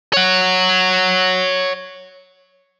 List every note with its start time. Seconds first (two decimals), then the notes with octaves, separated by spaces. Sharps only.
0.13 C#5 F#5